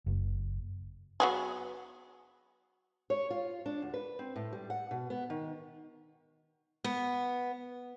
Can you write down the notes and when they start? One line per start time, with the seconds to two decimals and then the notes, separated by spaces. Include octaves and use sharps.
0.06 F#1
1.20 F#3 B3 G#4
3.10 C#5
3.30 F4
3.66 D4
3.82 D2
3.94 B4
4.19 C4
4.36 A2
4.53 G3
4.70 F#5
4.91 B2
5.10 B3
5.30 D#3
6.84 B3